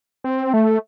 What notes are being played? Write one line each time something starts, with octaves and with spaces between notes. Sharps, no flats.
C4
A3